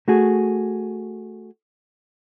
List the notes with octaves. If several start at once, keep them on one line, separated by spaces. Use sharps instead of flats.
A3 F#4 G#4